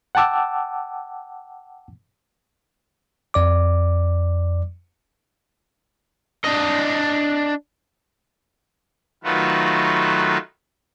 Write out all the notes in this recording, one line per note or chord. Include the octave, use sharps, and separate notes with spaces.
F#5 G5 A5 D6 E6
F2 D5 D6
D4 D#5
D#3 F#3 A3 F4 F#4 B4